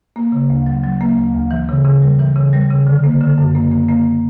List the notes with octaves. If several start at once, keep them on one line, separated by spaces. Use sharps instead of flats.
A#3
C#3
D2
F#3
F#3
A#3
D2
D2
E3
C#3
C#3
G3
E3
C#3
G3
C#3
D3
A#3
D3
F#2
A#3
A#3
A#3